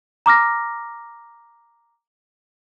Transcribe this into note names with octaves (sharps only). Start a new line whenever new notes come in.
A#5 D6 F6 A#6